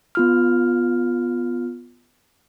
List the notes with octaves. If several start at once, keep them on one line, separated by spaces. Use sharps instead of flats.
B3 F4 F6